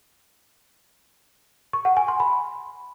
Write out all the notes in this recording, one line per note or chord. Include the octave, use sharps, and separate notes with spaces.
C#6
F#5
G#5
C6
B5